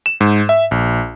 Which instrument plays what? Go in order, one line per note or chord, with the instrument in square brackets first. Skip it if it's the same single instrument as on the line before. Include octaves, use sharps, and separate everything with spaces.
[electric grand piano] E7
G#2
E5
A#1